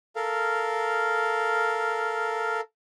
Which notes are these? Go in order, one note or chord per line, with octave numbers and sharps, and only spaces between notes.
A4 A#4 F5